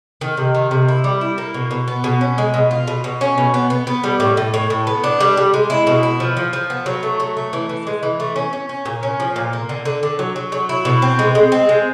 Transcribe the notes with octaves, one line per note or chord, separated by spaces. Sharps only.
D#3
C3
D#3
C3
E4
G3
E4
A#3
B2
B2
B3
B2
C#4
G#3
B2
F4
B2
B2
C#4
B2
B3
B3
B3
G3
A2
A2
A2
A2
B3
D4
G3
G3
G#3
E4
B2
E4
F3
F3
F3
B3
F#3
A3
F#3
A3
E3
E3
G#3
E3
A3
C#4
C#4
C#4
A#2
C#4
F3
A#2
A#3
D3
D3
D3
F#3
F#3
F#3
E4
B2
C4
G#3
G#3
C4
G#3